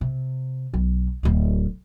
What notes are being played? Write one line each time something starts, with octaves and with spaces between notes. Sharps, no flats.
C3
B1
D1 B3